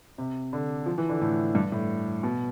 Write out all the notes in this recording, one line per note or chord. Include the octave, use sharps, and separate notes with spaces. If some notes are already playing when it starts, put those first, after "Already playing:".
C3
D3
F3
E3
D3
A2
G2
A2
B2